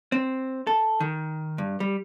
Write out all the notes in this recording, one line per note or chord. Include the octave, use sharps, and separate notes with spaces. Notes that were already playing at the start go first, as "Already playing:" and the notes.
C4
A4
D#3
G2
G3